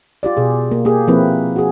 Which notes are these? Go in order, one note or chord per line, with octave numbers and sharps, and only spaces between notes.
F4 G4 D5
B2 G#4
A#3
A#3 G4 G#4
F3 A#3 C4 E4 B4
F#4 G#4